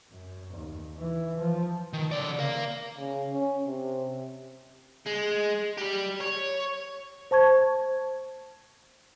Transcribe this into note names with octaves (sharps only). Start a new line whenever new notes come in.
F#2
D#2
E3
F3
D#3
C#3 D5
A#4 F5
C#3
C#4
C3
G#3
G3 G4
C#5
C5 A5 C#6 G#6